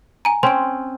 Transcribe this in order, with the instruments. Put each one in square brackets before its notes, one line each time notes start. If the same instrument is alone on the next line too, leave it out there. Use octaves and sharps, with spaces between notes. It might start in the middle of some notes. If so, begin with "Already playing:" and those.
[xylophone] G#5 A#5
[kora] C4 C#4 [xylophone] C6 D7